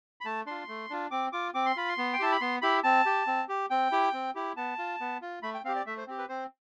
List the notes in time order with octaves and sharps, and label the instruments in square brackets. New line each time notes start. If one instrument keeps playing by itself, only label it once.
[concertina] B5
A3 A5
D4 F4 C6
A3
D4 F4
C4 D6
F4 D6
C4 D6
C6
F4 B5
C6
B3
G5
E4 G4 A5
B5
B3 C6
E4 G4 B5
C4 A5
G4
C4
G4
C4 G5
E4 G4
C4
E4 G4
B3 A5
F4
B3
F4
A3 B5
G5
C4 F5
G4
D5
A3 E5
C5
C4 G4
B4
C4 C5